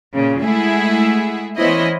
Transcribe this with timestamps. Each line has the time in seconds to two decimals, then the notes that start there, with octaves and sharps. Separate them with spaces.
0.13 A#2 C#3
0.42 G#3 A3 E4 G#4 E5 F#5
1.58 E3 B3 C#4 E4 C5 D#5